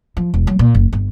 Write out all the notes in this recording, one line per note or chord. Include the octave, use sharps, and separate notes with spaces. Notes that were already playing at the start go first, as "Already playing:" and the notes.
F3
E1
F#3
A#2
F#1
G1